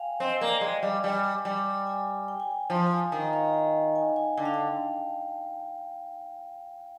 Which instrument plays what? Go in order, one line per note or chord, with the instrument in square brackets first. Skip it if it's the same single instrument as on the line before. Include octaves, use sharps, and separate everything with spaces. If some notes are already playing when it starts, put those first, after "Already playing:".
Already playing: [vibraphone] F5 G5 G#5
[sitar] C4 [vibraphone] D#5
[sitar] A#3 [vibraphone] D5
[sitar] G#3 [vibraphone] G5
[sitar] G3 [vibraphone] F5
[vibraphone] G5
[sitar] G3 [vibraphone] G#5
[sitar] G3 [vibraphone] G5
[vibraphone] G#5
G5
G#5
G5
[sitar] F3 [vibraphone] F5
[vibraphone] G#5
[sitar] D#3 [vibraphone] G5
[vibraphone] F5
G5
G#5
G#5
[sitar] D3 [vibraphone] G5
[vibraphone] F5
G5